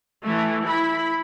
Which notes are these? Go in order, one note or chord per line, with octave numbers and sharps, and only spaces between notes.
E3 A3
E4 B5